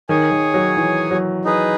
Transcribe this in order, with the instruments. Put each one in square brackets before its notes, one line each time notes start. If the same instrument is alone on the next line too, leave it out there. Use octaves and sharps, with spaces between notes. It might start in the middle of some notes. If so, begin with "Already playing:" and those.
[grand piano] D#3 [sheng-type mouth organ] G#4 C#5 G#5
[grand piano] D#3
F#3
E3
F#3
[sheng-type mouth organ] D#4 G#4 B4